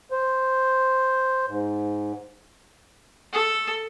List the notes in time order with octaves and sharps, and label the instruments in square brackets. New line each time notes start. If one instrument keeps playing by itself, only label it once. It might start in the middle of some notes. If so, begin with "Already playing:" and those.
[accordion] C5
G#2
[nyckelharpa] A4